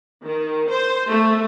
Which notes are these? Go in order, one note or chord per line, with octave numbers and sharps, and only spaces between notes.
D#3
C5
A3